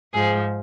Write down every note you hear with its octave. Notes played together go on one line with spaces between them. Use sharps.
G#2 F3 G#4